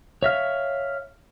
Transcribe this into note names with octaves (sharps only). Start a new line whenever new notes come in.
C#5 E5 F5